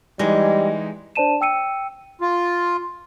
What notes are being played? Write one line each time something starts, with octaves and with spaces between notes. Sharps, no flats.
E3 G3 G#3 D#4
D4 C5 D5 A5 D#7 E7
G5 E6 C#7 D#7
F4